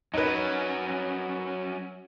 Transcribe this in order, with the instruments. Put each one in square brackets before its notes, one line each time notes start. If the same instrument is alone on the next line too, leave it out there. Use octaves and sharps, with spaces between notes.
[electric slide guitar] F#3 C#4 [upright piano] D#4 B4